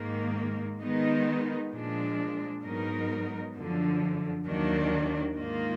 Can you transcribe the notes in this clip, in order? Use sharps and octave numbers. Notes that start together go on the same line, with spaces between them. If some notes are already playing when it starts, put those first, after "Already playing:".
Already playing: G#2 D#3 A#3
D#3 G#3 B3 D#4
A#2 F3 G#3 D4
G#2 F#3 B3 D#4 A#4
F#2 D3 F3
D#2 D#3 F#3 A#3 D4
G#2 D#3 A#3 F4